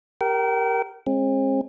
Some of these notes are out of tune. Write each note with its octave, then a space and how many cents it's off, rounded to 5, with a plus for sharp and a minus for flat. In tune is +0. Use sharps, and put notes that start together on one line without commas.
G4 +15 A#4 +0 G5 -35
G#3 +0 C4 +45